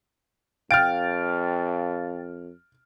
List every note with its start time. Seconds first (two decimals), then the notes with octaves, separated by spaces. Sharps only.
0.71 F2 F5 G5 F6 A6 D7